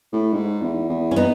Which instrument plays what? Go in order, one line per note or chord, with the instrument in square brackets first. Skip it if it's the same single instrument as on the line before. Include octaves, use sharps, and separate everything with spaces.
[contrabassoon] A2
G#2
E2
E2
[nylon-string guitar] C#4
B3 D#4